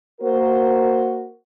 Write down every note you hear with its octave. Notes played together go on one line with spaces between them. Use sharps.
A#3 F#4 A#4 C5